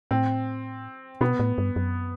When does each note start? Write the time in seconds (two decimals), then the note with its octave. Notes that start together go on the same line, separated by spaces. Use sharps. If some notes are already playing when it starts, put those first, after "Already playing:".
0.11 A2 C4
1.21 B2 B3
1.39 A2
1.58 G2
1.76 F#2